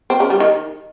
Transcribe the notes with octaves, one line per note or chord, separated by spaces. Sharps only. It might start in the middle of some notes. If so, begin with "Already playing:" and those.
C4
C#3
G3
D#3